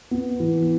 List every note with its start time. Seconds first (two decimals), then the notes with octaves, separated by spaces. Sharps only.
0.11 B3
0.40 E3